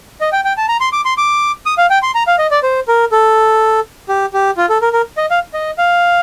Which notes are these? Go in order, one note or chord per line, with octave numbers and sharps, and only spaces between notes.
D#5
G5
G5
A5
A#5
C6
D6
C6
D6
D#6
F5
G5
C6
A#5
F5
D#5
D5
C5
A#4
A4
G4
G4
F4
A4
A#4
A#4
D#5
F5
D#5
F5